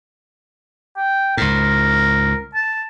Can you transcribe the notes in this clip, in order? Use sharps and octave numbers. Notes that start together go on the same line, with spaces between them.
G5
C#2 G#2 A#4
A5